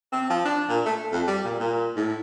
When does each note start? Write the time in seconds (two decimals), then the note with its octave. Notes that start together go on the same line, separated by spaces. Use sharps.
0.12 C4
0.30 F3
0.45 D4
0.69 A#2
0.86 A3
1.12 F2
1.27 G3
1.44 A#2
1.60 A#2
1.96 A2